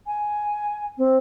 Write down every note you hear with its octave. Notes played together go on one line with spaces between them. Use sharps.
G#5
C4